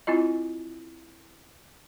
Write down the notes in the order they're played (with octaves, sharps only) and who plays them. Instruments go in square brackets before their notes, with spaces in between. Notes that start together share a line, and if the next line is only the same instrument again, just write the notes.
[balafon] C4 E4 F4 D#5